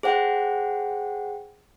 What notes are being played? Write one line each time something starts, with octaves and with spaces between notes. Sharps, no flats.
G#4 C5 F#5 G5